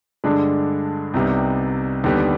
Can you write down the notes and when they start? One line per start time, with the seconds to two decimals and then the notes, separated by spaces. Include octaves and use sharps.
0.24 G2 D3 G#3 D4
1.14 C2 C3 G3 B3 D#4
2.04 D#2 D3 G3 B3